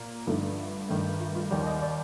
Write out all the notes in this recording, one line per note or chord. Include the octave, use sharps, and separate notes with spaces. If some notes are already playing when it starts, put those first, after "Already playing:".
Already playing: A#2 A#3
G2 D3 F3 A3 D#4
G2 D#3 A3
F4
F4
D#2 D#3 G3 D5
D#5
D5